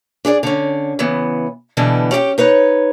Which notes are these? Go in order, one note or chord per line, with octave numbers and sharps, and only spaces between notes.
D4 G#4 C#5 D5
D3 C#4
C#3 E3 B3
B2 D3 E3 G3 B3
C#4 G4 D5 G5
D#4 B4 C#5